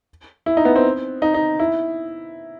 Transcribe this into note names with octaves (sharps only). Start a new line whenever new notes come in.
E4
D#4
B3
C4
D#4
D#4
E4